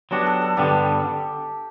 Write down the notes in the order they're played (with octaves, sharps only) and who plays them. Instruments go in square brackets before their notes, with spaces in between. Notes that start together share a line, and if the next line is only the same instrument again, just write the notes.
[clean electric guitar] F#3 B3 D4 F#4 [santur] G4
[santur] A4
A4
[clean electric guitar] G2 D3 G3 B3 D4 [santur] G4